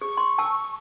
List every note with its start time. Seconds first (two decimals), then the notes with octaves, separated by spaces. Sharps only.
0.01 G#4 C#6
0.17 C6
0.38 G#5 A5 E6